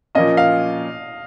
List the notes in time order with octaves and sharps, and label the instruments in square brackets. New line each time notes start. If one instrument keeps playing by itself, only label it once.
[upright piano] A#2 F3 A#3 C#4 F4 [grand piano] D#5
[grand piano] F5